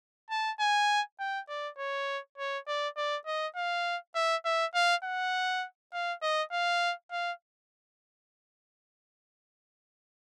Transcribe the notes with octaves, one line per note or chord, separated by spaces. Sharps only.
A5
G#5
G5
D5
C#5
C#5
D5
D5
D#5
F5
E5
E5
F5
F#5
F5
D#5
F5
F5